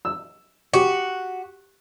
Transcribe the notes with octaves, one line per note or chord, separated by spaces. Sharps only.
E6
F#4 G4